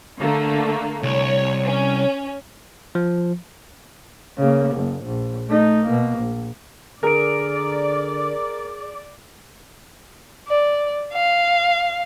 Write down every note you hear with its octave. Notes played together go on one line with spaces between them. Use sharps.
D3 A3 A#3
C2 C#5
C#4
F3
C#3 A#3
F#1
A#1
A3 D#4
B2 A#3
A#1
D3 G#4 A#4 D5 D7
D5
F5